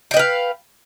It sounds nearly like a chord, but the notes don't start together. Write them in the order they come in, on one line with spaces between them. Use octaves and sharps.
G5 D#5 B4 F5